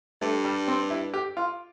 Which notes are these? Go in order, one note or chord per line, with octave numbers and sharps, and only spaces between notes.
G2 A3
G3
C4
E4
G4
F4